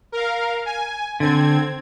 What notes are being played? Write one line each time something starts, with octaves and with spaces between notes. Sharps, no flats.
A#4 F5
G#5
D3 C4 G#6